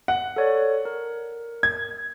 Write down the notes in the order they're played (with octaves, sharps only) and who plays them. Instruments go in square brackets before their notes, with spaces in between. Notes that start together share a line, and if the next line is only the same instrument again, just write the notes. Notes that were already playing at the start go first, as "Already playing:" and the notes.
[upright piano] F#5
[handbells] A4 C#5 D5
A#4
[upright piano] G#6